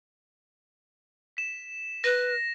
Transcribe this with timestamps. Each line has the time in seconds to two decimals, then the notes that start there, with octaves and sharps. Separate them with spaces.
1.37 B6 E7
2.04 B4 A#6